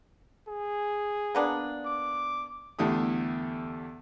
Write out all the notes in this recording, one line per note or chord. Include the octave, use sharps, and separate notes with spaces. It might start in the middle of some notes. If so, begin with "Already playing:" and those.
G#4
A#3 B3 D4
D6
E2 D3 A3 E4 G4 D#6